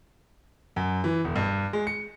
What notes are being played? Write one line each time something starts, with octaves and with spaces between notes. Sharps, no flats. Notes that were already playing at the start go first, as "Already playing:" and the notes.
F#2
E3
E1
G2
G#3
C#7